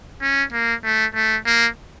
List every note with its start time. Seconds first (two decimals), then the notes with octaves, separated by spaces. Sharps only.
0.22 C#4
0.53 A#3
0.84 A3
1.15 A3
1.46 A#3